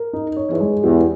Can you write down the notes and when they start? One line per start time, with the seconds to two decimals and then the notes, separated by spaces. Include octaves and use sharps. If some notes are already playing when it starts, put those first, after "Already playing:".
Already playing: A#4
0.13 D#4
0.37 C#5
0.48 E2
0.60 G#3
0.83 E2 G4